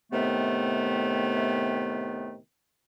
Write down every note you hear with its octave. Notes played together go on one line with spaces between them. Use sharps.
A2 C3 D#3 A3 B3